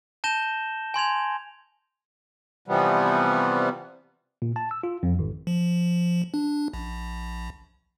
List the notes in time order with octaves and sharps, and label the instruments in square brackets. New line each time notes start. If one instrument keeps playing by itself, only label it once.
[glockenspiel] A5 G6 A#6 E7 G7
G#5 C6 G#6 F7
[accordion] C3 E3 F3 G3 B3
[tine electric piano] A#2
A5
E6
F4
F2
G#1
[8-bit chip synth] F3
D4
A#1